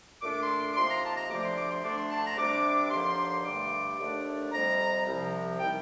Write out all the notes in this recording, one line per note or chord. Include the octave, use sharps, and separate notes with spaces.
A#2 A3 D4 D6
C6
D6
C3 F3 A#3 D#4 C6
A#5
A5
A#5
D2 C3 F3 A3 D4 D6
C6
D6
C6
D2 D3 A3 D4 D6
C6
A5
A#5
C3 G3 D4 D6
D#2 D3 F3 A#3 C6
G2 D3 A3 D6
D#2 D3 A3 D4
F2 C3 G3 A#5
C2 C3 F3
D#3 G3 G5